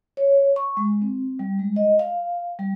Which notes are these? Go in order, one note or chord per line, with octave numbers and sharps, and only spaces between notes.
C#5
C#6
G#3
C4
G3
G#3
D#5
F5
G3